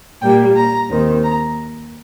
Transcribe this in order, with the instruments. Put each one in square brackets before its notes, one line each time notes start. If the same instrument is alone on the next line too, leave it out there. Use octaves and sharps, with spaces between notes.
[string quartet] A#2 G3 A#3 G5
A#5
D#2 D#3 C4
A#5